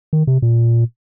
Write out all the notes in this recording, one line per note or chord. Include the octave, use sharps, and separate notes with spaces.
D#3
C3
A#2